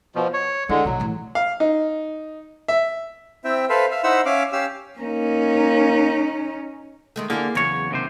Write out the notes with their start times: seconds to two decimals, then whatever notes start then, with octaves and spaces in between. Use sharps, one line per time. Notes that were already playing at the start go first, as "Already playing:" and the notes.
0.15 B2 F3
0.33 C#5
0.69 D3 G#3 E4
0.85 A#1 B2 F#3
1.00 A2 E3
1.35 F5
1.60 D#4
2.68 E5
3.44 C4 E4 E5 G5
3.69 A4 B4 C5 E5 F5
3.91 E5 F5
4.04 D#4 E4 C5 E5 F#5 E6
4.26 C#4 E5 F5 D6
4.52 C#4 G4 F5 E6
4.99 A#3 C#4 D#4
7.16 D#3 G#3 A3
7.30 D3 A#3 E4 G#4
7.55 E2 C#3 F#3 C#5
7.91 D#2 C3 C5